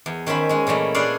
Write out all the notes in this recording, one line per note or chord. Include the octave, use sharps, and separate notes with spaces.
E2
D#3 C#4 C5 E5 B5
G#3 C#4
A#2 E3 G3 A3
D4 E4 G#4 C#5 D5 F5